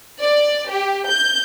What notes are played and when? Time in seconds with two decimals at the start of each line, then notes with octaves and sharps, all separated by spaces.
0.21 D5
0.68 G4
1.07 G6